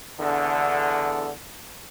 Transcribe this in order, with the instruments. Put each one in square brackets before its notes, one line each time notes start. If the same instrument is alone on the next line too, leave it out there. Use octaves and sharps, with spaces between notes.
[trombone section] E2 D3